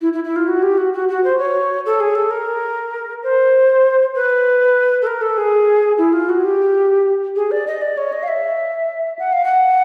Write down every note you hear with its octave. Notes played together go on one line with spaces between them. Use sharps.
E4
E4
E4
F4
F#4
G4
F#4
F#4
F#4
C5
C#5
A4
G#4
A4
A#4
C5
B4
A4
A#4
A4
G#4
E4
F4
F#4
G4
G#4
D5
D#5
D5
C#5
D#5
F5
E5
F#5
F5
F#5